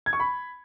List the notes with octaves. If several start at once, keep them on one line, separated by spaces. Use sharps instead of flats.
G#6
C#6
B5